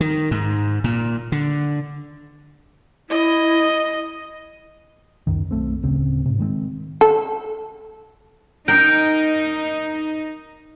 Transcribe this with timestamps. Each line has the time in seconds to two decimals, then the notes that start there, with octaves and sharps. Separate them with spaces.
0.01 D#3
0.31 G#2
0.84 A#2
1.32 D3
3.10 E4 D#5
5.27 C#2 F#2 D#3
5.51 B1 A3 C4
5.83 D1 C#3 C4
6.26 G#2 C3
6.39 D#3 G#3 A3 C4
7.01 A4
8.68 D#4 A#4 G5